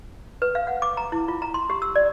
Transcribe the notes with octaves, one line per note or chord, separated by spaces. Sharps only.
B4
F5
F#5
D6
A#5
E4
F4
A#5
C6
G4
E6
D5